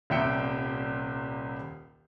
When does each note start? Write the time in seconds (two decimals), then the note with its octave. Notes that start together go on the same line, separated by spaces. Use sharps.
0.10 D#1 C2 E5 G5 C#7